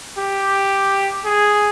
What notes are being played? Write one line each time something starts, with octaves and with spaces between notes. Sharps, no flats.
G4
G#4